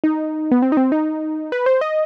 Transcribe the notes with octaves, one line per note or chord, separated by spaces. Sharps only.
D#4
B3
C4
D#4
C4
D#4
B4
C5
D#5